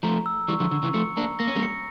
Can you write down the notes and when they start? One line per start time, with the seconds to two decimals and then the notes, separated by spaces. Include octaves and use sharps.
0.03 F3 A3 A#5
0.26 E6
0.48 E3 G3 C#6
0.60 D3 F3
0.71 D3 E6
0.83 C#3 E3
0.94 F3 A3 C#7
1.17 A#3 D4 A#5
1.39 A#3 A#6
1.48 C#4
1.55 G3 A#3
1.63 C#7